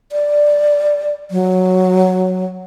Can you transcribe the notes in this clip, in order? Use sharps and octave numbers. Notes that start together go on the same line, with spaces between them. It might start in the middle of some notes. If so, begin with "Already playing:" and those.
D5
F#3